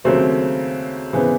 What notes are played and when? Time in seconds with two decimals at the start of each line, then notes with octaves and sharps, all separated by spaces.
0.04 D#2 C#3 F#3 A3 C4
1.13 C#3 E3 G#3 B3 C4